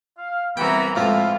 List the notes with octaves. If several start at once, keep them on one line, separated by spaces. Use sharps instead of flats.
F5
C2 E3 B3 F#4 G5 A#5
F2 A2 G#3 A3 F4 B4 E5 F5